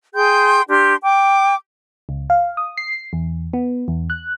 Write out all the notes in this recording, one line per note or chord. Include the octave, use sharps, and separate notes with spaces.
G#4 G5 C6 G6
D4 G4 C6 F6
G5 D6
C#2
F5
D#6
C7
E2
B3
E2
F#6